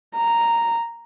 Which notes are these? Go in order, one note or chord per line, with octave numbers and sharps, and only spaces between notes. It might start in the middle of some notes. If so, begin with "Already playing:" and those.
A#5